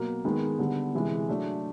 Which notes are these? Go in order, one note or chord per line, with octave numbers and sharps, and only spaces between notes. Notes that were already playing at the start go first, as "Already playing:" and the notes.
Already playing: B2 F#3 A#3
D#3 G#3 B3
D3 G3 B3
C3 E3 G#3
F#3 A3 D4